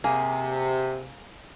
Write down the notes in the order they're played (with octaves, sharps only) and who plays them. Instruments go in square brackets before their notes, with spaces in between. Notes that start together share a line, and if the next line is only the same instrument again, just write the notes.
[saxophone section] C3 [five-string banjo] A#3 G#4